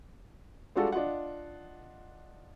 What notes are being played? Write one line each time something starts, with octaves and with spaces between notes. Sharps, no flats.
G3 G#3 D4 F4 F#4 A4
D4 F4 D#5 F#5